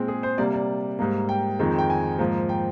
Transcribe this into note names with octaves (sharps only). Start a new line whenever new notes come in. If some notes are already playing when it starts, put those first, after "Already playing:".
Already playing: A#2 G#3 C4
G#4
C5
C3 G3 A#3 D5
D5
G#2 G3 A#3
G5
F2 D#3 G#3 C4
G5
G#5
G#2 F3 A#3
G5